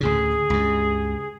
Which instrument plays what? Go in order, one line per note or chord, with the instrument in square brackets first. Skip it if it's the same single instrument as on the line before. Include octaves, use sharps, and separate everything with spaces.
[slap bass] D2 A2 C#3 [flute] G#4
[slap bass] C#2 G2